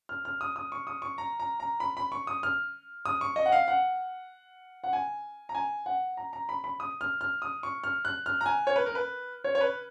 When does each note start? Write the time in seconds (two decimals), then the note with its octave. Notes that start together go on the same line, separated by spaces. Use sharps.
0.09 F6
0.25 F6
0.41 D#6
0.56 D#6
0.72 C#6
0.87 D#6
1.02 C#6
1.18 A#5
1.40 A#5
1.60 A#5
1.80 B5
1.97 B5
2.12 C#6
2.27 D#6
2.43 F6
3.05 D#6
3.21 C#6
3.36 D#5
3.46 F#5
3.52 F5
3.68 F#5
4.84 F#5
4.93 G#5
5.49 A#5
5.55 G#5
5.86 F#5
6.17 A#5
6.33 A#5
6.49 B5
6.64 B5
6.80 D#6
7.01 F6
7.21 F6
7.42 D#6
7.63 C#6
7.84 F6
8.05 F#6
8.26 F6
8.41 A#5
8.46 G#5
8.67 C#5
8.76 B4
8.86 A#4
8.95 B4
9.44 C#5
9.55 C#5
9.61 B4